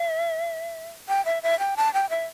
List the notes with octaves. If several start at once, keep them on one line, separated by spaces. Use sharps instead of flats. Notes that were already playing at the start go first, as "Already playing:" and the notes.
Already playing: E5
G5
E5
E5
G5
A5
G5
E5